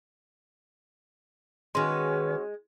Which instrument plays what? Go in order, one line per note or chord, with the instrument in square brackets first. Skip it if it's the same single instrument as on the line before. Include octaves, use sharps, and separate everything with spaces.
[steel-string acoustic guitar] D#3 B4 [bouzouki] G#3 [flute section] C#4 F#4 C#5 [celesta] C6